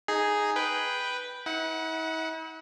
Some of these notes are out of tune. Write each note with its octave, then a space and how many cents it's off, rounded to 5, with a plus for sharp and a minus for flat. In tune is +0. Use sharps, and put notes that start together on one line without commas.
D#4 +0 G#4 +0 G#5 +0
B4 +0 G5 +0
E4 -45 F#5 +0